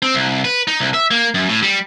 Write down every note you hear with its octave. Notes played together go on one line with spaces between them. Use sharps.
C4
C2
B4
D#4
C2
E5
A#3
F#2
A2
G3